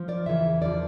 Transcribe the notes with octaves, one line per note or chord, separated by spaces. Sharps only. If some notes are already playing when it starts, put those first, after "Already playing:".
Already playing: F3
A#4 D5
E2 C#3 E3 E5
E2 D3 F3 A#4 D5